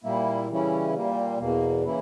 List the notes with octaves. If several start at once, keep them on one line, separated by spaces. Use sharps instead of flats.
A#2 G3 A#3 E4
C#3 E3 G3 C#4 E4
A#2 G3 A#3
E2 B2 A#3
C#3 E3 A#3 E4